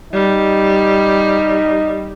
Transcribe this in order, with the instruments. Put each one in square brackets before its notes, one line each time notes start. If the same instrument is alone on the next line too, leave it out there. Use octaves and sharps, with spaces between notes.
[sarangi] G3 [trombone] D#4